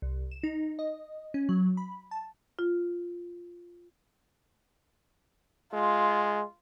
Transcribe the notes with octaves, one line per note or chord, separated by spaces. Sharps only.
C2
E7
D#4
D#5
C#4
F#3
B5
A5
F4
G#3 F4